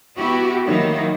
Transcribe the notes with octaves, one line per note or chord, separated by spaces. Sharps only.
B3 E4 F#4 G4
D#3 F#3 A#3 D#4 E4